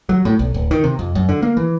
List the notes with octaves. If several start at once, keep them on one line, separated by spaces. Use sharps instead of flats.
F#3
A2
B1
D1
D#3
C3
F2
F#2
D3
A#3
E3